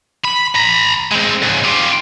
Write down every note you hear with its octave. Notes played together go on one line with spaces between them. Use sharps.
B5
A#5 B5
G#3 C4
C#2 G#2
F4 G4